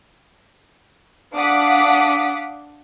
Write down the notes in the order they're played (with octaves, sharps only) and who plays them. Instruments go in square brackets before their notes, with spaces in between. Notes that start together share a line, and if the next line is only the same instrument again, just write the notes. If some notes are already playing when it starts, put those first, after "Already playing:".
[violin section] D4 F5 F#5 D6 D#6 B6